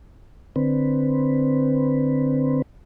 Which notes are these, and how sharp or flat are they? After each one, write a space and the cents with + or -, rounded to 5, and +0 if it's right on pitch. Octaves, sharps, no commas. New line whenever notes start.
D3 +10 C4 +0 B4 +0